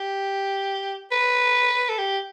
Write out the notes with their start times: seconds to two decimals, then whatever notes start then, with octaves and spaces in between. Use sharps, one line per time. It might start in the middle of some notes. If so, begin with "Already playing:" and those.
Already playing: G4
1.11 B4
1.89 A4
1.98 G4